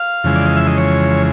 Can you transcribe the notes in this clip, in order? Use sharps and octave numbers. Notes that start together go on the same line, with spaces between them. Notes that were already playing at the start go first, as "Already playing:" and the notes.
Already playing: F5
F2 C#3 E3 G#3
D5
D#5
E5
D#5
C#5